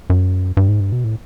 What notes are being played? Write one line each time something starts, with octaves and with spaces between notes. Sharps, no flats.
F#2
G2
G#2
G2
B2
A2